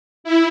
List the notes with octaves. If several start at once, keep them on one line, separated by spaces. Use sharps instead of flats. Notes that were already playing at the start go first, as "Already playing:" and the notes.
E4